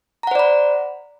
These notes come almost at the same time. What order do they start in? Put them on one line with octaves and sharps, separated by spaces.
A#5 F#5 C5 D5 B5